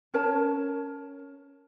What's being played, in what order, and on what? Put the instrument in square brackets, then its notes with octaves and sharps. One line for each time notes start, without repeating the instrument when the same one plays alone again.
[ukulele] C#4 A#4 C#5 A5